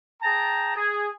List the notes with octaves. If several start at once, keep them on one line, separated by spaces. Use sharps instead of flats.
G#4 G5 A5 A#5
G#4